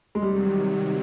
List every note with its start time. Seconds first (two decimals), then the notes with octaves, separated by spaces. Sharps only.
0.15 G#3
0.22 C3 D#3 F#3 G3